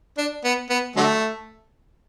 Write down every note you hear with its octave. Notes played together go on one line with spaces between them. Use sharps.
D4
B3
B3
D3 F#3 A3